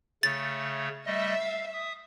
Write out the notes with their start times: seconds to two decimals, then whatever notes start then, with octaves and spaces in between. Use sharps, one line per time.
0.23 C#3 A3 C#5 A6
1.06 G3 A3 D#5 E5
1.40 F5
1.73 E5 D#6